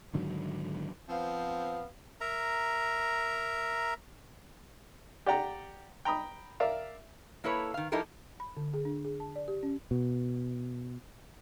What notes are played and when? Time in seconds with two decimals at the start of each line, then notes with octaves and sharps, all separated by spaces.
0.14 G#2 D3 D#3 F#3
1.09 F3 B3 C4 F5
2.21 A#4 E5 A#5
5.26 G4 D5 F#5 G5 A#5
6.05 G5 A#5 B5 D#6
6.60 A#4 D5 E5 F5
7.44 A#3 E4 A4 B4 C#5
7.74 D#3 F5
7.92 F3 D#4 E4 G4 A4 A#4
8.40 B5
8.57 D3
8.74 G#4
8.85 D4
9.05 G#4
9.20 A5
9.36 D5
9.48 G4
9.63 C#4
9.91 B2